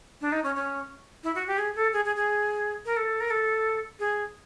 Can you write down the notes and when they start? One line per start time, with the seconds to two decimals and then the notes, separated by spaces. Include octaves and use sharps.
0.21 D4
0.32 D#4
0.44 C#4
0.56 C#4
1.24 E4
1.35 F#4
1.47 G4
1.58 G#4
1.76 A4
1.93 G#4
2.05 G#4
2.16 G#4
2.85 A#4
2.97 A4
3.20 A#4
3.30 A4
3.99 G#4